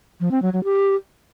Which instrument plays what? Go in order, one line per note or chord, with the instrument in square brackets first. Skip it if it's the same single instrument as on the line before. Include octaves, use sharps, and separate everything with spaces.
[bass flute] F3
C4
F#3
F#3
G4